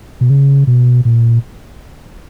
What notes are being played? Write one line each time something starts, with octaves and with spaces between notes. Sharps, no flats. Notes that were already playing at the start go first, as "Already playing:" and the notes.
B2
C#3
B2
A#2